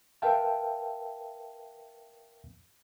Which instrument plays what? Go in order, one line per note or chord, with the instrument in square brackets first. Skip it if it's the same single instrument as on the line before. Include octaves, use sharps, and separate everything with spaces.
[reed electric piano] A#4 B4 E5 F5 G5 A5